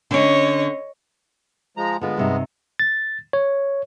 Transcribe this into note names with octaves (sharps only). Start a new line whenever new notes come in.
D3 C#4 C#5 D#5
F3 G#3 A#5
D3 G#3 B3 F4
G2 C3 D#4
A6
C#5